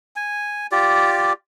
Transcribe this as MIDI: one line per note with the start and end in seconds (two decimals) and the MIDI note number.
0.16 0.67 80
0.72 1.33 65
0.72 1.33 67
0.72 1.33 74